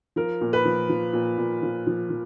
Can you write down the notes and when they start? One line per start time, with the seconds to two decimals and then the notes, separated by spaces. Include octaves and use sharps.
0.16 F3 A#4
0.41 A#2
0.53 B4
0.65 F3
0.89 F3
1.13 A#2
1.38 A#2
1.62 F3
1.87 F3
2.10 F3